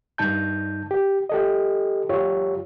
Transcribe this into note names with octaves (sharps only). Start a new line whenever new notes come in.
G2 D#4 A5 G6
G4
G4 A4 D#5
F#2 F4 G4 C#5